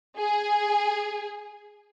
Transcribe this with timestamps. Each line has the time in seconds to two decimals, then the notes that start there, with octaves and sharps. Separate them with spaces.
0.19 G#4